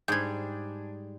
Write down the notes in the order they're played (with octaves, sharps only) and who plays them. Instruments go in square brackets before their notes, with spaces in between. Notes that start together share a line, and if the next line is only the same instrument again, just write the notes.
[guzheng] G#2 G3 [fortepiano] D4 G#4 [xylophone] G6 G#6